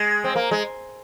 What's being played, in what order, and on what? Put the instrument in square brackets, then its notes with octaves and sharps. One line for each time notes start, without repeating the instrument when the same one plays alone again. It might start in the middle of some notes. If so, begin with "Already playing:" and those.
Already playing: [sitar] G#3
C4
A#3
G#3